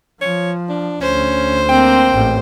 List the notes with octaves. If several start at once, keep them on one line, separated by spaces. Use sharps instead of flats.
F3 C#5
D4
D2 C#4 C5
A#3 C4 G5
A1 G#2